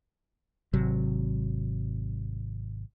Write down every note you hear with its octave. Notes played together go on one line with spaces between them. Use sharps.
G#1 C3 F#3